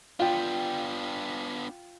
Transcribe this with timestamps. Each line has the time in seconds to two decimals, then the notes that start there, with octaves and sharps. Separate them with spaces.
0.20 B3 D4 F4 G5